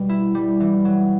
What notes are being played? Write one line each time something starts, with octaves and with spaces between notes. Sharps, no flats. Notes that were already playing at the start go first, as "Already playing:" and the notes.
Already playing: B2 G3
E4
G3
E3
F#3